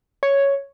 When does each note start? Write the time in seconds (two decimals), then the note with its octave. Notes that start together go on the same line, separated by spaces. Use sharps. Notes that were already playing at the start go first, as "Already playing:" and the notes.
0.23 C#5